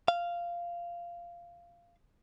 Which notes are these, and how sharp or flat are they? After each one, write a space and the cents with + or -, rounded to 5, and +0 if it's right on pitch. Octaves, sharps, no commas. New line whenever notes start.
F5 -10